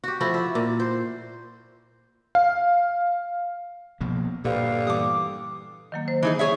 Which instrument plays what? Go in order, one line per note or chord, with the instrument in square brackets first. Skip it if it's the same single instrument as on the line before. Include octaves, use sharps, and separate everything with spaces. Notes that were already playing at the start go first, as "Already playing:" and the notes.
[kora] F#4 G4
F3 A3 E4 F#4
E5
A#2
C5
[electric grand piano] F5
[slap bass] B2 F3 A#3
[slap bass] G2 A#2 [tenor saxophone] D3 [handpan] G4 B4 F5
[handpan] E3 G3 G4 [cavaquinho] D6 D#6
[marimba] D#3 F#3 A#3
C5
[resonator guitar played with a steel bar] E3 D#4 G#4 [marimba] B5
[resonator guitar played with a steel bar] G#4 C#5 E5